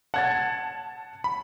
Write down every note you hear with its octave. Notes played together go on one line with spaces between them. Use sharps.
F#5 A5 G#6 A6
B5